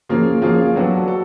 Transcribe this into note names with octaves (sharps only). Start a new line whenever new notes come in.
F3 A#3 C#4 F4 G#4
F3 A#3 C#4 F4 G#4
F#3 B3 D4 F#4 A4
F#4 A4